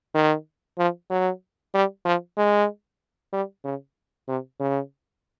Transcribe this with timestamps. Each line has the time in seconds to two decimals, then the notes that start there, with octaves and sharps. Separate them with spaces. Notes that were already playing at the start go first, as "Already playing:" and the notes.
0.14 D#3
0.78 F3
1.10 F#3
1.74 G3
2.05 F3
2.37 G#3
3.33 G3
3.64 C#3
4.28 C3
4.60 C#3